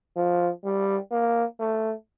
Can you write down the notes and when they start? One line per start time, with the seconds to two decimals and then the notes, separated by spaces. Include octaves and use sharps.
0.16 F3
0.64 G3
1.11 A#3
1.60 A3